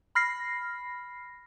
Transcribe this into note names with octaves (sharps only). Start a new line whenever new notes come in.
B5 F6 A#6 C7